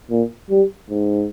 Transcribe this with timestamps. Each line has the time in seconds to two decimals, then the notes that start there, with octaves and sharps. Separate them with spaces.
0.10 A#2
0.50 G3
0.90 G#2